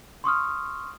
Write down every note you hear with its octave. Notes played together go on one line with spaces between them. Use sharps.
C6 C#6 D#6 F6